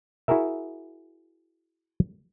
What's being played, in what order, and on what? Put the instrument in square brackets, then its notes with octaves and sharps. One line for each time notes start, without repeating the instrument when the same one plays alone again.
[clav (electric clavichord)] E4 F#4 G#4 A#4 E5